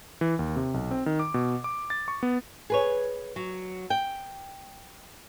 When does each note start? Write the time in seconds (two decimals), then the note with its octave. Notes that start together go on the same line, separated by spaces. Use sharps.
0.21 E3
0.39 D#2
0.56 C3
0.74 B1
0.91 C4
1.06 D#3
1.19 D6
1.34 B2
1.64 D6
1.90 A6
2.08 C#6
2.23 B3
2.70 G#4 B4 C#5
3.36 F#3
3.90 G5